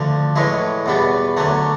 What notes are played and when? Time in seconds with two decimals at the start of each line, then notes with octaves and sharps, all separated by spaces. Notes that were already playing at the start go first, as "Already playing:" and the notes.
Already playing: D2 D3 F3
0.36 A2 E3 G#3 C#4 E4
0.86 E2 B2 G3 B3
1.37 D2 D3 F#3 A3